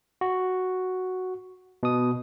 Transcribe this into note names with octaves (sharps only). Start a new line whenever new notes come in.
F#4
B2 D#6